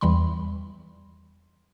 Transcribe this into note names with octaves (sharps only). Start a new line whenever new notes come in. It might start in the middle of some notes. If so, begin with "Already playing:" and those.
E2 E3 G3 B5 C6